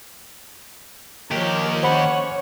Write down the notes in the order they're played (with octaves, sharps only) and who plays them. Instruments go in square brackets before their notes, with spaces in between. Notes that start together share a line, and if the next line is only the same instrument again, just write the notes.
[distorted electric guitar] D#2 G4 [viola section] F3 A#4 C#5
[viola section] C#4 C#5 [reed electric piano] C5 B5 [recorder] F#5